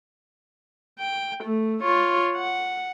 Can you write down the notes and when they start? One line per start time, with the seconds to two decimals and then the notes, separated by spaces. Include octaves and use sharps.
0.99 G5
1.44 A3
1.82 F4 C#5
2.36 F#5